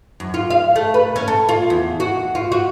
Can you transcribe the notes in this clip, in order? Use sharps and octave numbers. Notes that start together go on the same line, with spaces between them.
F#2
F4
F5
A3
B4
C#4
A4
F4
E2
F#4
F4
F#4